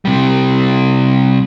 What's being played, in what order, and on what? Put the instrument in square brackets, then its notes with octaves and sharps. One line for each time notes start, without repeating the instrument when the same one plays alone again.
[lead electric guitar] C3 G3